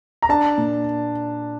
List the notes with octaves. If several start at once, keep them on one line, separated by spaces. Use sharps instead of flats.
A#5
D4 A5
A#2